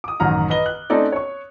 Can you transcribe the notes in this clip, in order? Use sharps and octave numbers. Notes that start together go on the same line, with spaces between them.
D6 D#6
A1 F#2 D#3 F#5 A#5 F6
B4 D#5 G7
F#6
A3 C4 C#4 D#4 A4 D5
C#5 C#6